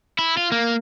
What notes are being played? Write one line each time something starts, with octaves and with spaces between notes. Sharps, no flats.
E4
F4
A#3